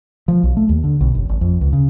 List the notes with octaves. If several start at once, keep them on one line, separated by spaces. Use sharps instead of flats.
F3
B1
A3
D#2
D3
B1
F#1
G#1
F2
C#2
C#3